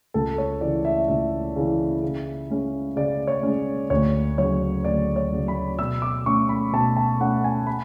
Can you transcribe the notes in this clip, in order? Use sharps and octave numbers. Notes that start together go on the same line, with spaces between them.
C#2 A4
C#5
C#3 E3 D5
E5
C#2 E5
C#3 E3
C#3
G#3 C#4
C#3 D5
C#5
G#3 C#4
D2 C#5
C#3 F#3 C#5
D2 D5
C#5
C#3 F#3
B5
B2 E6
D6
A3 C#4 C#6
B5
B2 A5
A5
A3 C#4 F#5
G#5
B5